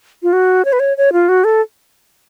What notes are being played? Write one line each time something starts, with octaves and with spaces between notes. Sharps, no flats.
F4
F#4
C#5
B4
C#5
C#5
F4
F#4
A4